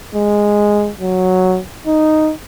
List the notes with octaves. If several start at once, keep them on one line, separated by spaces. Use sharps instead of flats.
G#3
F#3
D#4